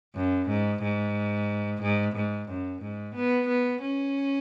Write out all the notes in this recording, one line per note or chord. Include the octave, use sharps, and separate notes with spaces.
F#2
G#2
G#2
G#2
G#2
F#2
G#2
B3
B3
C#4